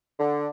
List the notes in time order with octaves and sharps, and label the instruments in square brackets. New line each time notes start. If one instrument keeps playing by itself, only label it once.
[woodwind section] D3